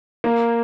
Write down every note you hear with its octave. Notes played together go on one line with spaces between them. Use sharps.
A#3